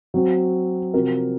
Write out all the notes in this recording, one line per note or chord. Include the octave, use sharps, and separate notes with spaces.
F#3 C4 F#4
C3 F3 C4 F#4 A#4